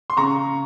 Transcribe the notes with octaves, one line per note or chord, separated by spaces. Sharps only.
C6
C#3 A#5 C#6